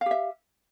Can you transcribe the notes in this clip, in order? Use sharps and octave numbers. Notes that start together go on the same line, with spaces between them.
G4 E5 F5